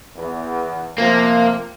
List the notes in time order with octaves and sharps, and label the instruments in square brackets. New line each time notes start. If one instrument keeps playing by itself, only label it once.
[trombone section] E2
[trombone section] C3 F3 [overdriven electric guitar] A#3